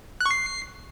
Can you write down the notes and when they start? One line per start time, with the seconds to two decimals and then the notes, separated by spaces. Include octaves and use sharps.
0.21 F#6
0.26 C#6
0.31 C7